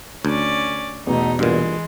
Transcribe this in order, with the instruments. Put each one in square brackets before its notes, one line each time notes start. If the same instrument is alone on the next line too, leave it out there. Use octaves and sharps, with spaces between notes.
[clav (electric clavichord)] D2 [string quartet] C#4 D5
[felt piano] E2 B2 [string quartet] A3 D#4
[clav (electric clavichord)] G2 A#2 [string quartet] E3 G#3